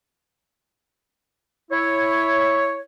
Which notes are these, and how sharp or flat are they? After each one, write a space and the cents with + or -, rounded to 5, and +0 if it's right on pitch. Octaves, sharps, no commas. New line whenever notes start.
E4 +0 C#5 +0